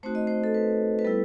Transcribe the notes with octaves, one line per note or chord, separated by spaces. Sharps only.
A3 C4 D#4 F#4 C5
D#5
C5
A4
B4
B4
G3 B3 E4 A4